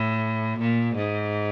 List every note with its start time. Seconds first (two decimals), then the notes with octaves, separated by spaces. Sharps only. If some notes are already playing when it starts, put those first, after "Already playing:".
Already playing: A2
0.58 A#2
0.95 G#2